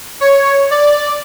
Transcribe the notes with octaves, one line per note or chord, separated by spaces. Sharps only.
C#5
D5